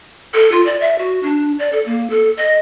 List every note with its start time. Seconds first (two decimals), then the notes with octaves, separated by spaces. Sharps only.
0.34 A4
0.52 F4
0.65 D5
0.81 E5
0.98 F#4
1.23 D4
1.59 D5
1.72 A4
1.86 A#3
2.10 A4
2.37 D#5